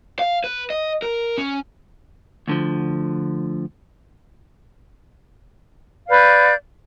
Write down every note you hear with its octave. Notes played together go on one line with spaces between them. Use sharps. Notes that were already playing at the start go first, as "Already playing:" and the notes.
F5
B4
D#5
A#4
C#4
D2 D3 F3
B4 D5 F5 G6